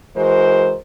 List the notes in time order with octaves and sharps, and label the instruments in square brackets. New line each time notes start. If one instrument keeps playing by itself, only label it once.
[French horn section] E3 G#3 F#4 A#4 C5